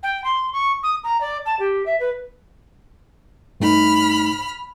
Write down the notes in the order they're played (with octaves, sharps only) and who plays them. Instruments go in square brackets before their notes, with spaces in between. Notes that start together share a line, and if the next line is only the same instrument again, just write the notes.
[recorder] G5
C6
C#6
D#6
A#5
D5
A5
G4
E5
B4
[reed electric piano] G2 A3 D#4 [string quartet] B5 F6